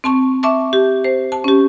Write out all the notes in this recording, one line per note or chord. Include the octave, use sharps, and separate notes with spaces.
C4 A5 C#6
E5 A5 C#6 D6
G4
C5
A5
C#4 G4